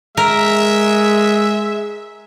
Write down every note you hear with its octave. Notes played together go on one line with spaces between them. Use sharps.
G#3 A#4 E5